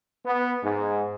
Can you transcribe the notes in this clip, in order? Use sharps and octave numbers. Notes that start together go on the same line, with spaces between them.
B3
G#2